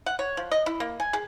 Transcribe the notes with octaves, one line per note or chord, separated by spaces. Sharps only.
F#5
C#5
F3
D#5
E4
A#3
G#5
G#4